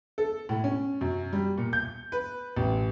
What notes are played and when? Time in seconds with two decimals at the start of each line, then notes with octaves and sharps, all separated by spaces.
0.18 A4
0.49 A2
0.64 C#4
1.01 F#2
1.33 G3
1.58 A#2
1.73 G6
2.12 B4
2.57 A1